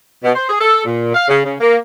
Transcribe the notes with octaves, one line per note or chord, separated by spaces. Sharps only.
B2
C5
G#4
A4
A#2
F5
C#3
C#3
A#3